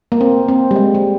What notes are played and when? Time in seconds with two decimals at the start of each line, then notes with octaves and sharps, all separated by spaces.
0.12 A#3
0.21 C4
0.48 C4
0.71 G3
0.76 G#3
0.95 G3